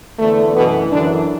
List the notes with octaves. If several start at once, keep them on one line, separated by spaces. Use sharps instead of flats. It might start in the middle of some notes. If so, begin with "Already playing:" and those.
E2 D3 A3
F#2 B2 E3 B3
F#2 D3 E3 D4